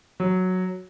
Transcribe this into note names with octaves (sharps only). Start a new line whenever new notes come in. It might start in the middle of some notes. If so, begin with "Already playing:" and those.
F#3